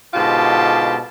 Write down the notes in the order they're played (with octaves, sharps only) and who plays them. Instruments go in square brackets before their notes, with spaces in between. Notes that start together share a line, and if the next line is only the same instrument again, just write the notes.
[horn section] G#2 B2 D3 F4 G4 A5